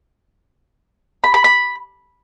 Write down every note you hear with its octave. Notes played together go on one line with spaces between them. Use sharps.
B5
B5
B5